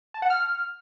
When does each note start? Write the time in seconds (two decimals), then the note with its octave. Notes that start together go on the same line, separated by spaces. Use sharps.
0.14 A5
0.22 F#5
0.30 F6